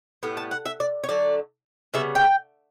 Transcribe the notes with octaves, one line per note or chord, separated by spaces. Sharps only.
A2 G3 B3
A5
F#5
E5
D5
C#5
D3 F#3 A3 D5
C#3 G3 B3 E5
G5